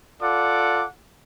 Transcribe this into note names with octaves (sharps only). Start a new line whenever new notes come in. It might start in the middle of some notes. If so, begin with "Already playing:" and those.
F4 A4 D5 F#5 D6